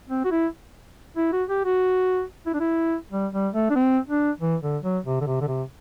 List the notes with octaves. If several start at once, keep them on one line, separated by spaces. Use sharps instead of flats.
C4
F#4
E4
E4
F#4
G4
F#4
E4
D4
E4
G3
G3
A3
D4
C4
D4
E3
D3
F#3
C3
D3
C3
D3
C3